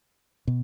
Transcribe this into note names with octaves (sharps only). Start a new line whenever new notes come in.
B2